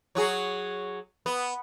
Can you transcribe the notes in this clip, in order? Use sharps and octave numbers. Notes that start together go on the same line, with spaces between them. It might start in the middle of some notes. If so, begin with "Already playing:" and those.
F#3 F#4 G#4
B3